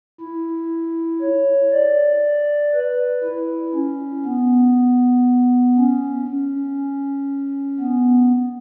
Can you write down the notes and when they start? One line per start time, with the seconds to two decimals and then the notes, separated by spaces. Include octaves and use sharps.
0.20 E4
1.21 C#5
1.72 D5
2.74 B4
3.23 E4
3.74 C#4
4.25 B3
5.77 C#4
6.28 C#4
7.80 B3